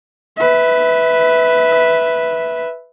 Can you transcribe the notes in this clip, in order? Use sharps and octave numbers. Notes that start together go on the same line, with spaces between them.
B4 E5